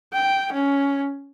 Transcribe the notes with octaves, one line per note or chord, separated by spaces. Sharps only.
G5
C#4